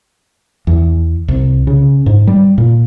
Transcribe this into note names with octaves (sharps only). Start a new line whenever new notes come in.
E2
C2
C#3
G#2
G3
A#2